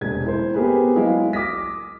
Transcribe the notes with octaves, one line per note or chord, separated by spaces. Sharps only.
E1 C3 G#6
E4 C5
B3 C4 G4 G#4 A#4 B4
F#3 G#3 E4 F5
D6 D#6 F6 A#6 B6